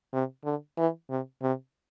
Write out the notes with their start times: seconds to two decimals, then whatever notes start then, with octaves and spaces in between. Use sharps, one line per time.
0.13 C3
0.44 D3
0.78 E3
1.10 C3
1.42 C3